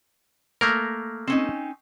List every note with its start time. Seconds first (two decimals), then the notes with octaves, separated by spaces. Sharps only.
0.61 A3 A#3 A#4
1.27 C4 C#4 D#4